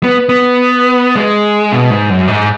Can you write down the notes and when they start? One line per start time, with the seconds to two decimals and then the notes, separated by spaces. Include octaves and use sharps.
0.04 B3
0.29 B3
1.16 G#3
1.72 B2
1.90 G#2
2.10 F#2
2.28 G#2